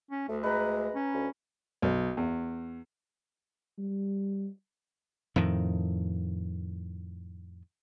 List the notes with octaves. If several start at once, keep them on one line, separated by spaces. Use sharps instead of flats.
C#4
D2 A3
G#3 B4 A#5
C#4
D2
B1
E2
G3
F2 A2 D#3